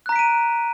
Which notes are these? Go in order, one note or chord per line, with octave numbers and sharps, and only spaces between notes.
A#5 F#6 B6 D7 D#7